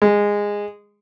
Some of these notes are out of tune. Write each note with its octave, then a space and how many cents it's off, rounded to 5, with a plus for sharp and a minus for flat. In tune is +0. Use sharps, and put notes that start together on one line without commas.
G#3 -15